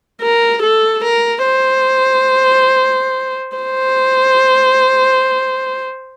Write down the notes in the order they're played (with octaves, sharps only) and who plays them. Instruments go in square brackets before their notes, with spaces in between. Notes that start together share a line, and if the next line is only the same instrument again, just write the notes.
[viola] A#4
A4
A#4
C5
C5